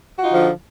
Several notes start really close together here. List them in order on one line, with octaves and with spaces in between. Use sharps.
F#4 F4 D#4 D3 F3